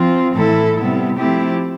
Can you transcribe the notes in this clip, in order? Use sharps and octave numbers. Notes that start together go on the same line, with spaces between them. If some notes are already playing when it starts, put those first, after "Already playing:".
Already playing: F3 C4 F4
A2 E3 A3 E4 A4
C3 G3 B3 E4
F3 A3 C4 E4 G4